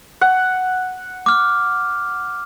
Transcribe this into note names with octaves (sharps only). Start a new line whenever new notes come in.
F#5
D6 F6